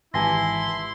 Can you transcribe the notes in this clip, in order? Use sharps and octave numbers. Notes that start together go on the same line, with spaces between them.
G#1 E3 E4 G4 G#5 A5 C6 A#6